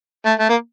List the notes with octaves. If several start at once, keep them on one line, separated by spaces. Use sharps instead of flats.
A3
A3
A#3